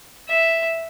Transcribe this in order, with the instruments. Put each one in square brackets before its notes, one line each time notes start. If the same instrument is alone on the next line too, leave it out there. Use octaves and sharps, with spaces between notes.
[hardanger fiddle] E5